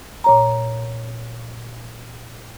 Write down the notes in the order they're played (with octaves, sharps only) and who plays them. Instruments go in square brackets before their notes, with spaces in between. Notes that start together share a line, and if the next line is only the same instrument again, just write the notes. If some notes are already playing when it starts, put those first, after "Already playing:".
[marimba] A#2 C#5 A#5